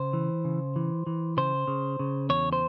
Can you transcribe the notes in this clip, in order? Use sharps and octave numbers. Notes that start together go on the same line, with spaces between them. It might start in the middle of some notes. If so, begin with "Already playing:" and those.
Already playing: C#3 C5
E3
C#3
E3
E3
C#3 C5
C#3
C#3
E2 C#5
C5